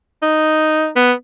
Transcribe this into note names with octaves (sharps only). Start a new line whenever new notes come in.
D#4
B3